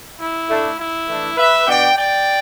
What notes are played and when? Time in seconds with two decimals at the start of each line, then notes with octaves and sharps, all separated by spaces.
0.18 E4
0.47 A2 A3 D4
0.77 E4
1.07 E3 A3 D4
1.37 B4 E5
1.66 B2 B3 D4 D5 G5
1.96 D5 G5